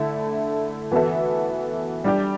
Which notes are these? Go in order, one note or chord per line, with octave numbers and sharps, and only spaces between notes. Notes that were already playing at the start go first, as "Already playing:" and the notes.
Already playing: D3 A3 E4 A4 E5
E3 B3 F#4 A4 E5
G3 D4 G4